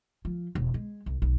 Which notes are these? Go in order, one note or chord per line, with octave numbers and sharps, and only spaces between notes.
F3
E1
G#3
C2
B1